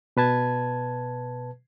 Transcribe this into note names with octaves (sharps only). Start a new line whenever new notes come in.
B2 B4 A5 G#6